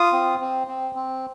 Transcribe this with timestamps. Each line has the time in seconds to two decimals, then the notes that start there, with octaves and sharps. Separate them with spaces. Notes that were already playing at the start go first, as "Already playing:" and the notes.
Already playing: F4 D#6
0.12 C4
0.40 C4
0.67 C4
0.95 C4